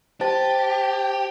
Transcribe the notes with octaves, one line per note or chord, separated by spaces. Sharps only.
G4 C5 A5 A6